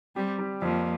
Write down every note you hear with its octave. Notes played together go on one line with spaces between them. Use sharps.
G3 C4 G4
G3
F2 F3 A#3